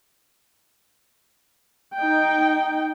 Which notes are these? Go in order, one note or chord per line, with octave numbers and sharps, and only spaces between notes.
D#4 G5